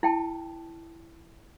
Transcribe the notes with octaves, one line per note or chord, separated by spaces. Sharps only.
E4 G5 A5